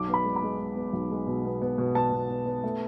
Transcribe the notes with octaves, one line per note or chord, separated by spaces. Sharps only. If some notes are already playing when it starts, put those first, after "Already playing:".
Already playing: B1 D6
B3
B5
G#3
B5
G#3
G#3
B3
B1
G#3
B2
B3
B3
B2
B3 A5
B2
B3
B3
A3